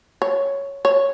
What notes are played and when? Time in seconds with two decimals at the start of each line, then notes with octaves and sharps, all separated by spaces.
0.22 C#5
0.85 C#5